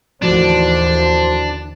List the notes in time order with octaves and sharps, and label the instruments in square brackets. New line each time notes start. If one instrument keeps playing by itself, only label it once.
[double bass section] D#2 D3 E3 [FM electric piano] A2 F3 F#4 [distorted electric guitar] D4 [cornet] C5